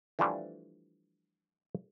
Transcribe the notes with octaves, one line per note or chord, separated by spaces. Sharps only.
E3 F3 G3 A3 D4